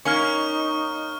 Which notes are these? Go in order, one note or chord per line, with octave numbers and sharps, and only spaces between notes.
A#3 C#4 D#4 C#6 F6